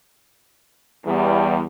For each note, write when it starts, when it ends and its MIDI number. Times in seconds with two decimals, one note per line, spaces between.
1.05 1.62 40
1.05 1.62 55